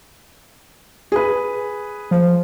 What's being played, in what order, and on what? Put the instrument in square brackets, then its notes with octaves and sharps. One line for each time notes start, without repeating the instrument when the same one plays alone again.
[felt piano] G#4 B4
[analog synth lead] F3